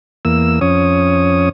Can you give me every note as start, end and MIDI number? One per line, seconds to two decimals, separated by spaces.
0.25 0.59 40
0.25 0.59 58
0.25 0.59 88
0.61 1.49 41
0.61 1.49 61
0.61 1.49 73
0.61 1.49 87